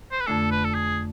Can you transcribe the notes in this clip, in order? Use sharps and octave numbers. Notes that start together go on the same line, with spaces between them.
C5
B4
F2 D3 A3 D4 A4
B4
A4
G#4